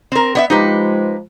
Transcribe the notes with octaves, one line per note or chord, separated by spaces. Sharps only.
C4 A#4
B3 D5 E5
F3 G#3 D#4 G4 B4